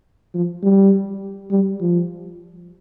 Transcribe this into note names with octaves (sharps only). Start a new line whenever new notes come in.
F3
G3
G3
F3